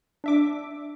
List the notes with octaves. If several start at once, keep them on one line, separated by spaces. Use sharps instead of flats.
D4 E5 D6